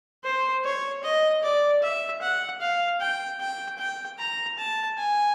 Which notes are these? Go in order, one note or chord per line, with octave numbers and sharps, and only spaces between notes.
C5
C#5
D#5
D5
E5
F#5
F5
G5
G5
G5
A#5
A5
G#5